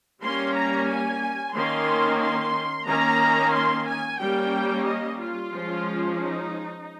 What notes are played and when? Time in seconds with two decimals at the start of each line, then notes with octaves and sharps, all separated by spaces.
0.22 G3 A#3 C#4 C6
0.56 A#5
0.89 G#5
1.55 D#3 A#3 C#4 C6
2.21 C6
2.88 D#3 A#3 C#4 A#5
3.54 C6
3.87 G#5
4.20 G3 A#3 C#4 G5
4.87 D#5
5.20 F4
5.53 F3 G#3 C#4
6.19 D#4